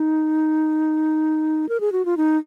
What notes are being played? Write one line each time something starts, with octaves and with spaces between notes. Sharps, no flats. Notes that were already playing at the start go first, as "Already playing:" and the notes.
Already playing: D#4
A#4
G#4
F#4
F4
D#4